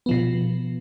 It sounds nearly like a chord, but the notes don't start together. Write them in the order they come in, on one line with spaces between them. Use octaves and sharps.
B3 F3 B2